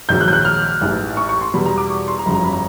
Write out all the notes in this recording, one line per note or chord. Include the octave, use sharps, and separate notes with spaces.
A#1 G#2 D#3 F#3 G6
F#6
G6
F#6
F6
A1 G#2 E3
C#6
C#6
C6
E2 B2 G3 B5
A#5
D6
C#6
C6
A#5
G1 F2 C#3 F#3 B5
A#5
B5
A#5